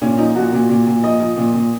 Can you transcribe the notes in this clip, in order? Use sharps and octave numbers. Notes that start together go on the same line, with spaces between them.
A#2 C#4
F3 D#4
A#2 F#4
A#2
A#2
A#2
F3 D#5
F3
A#2
A#2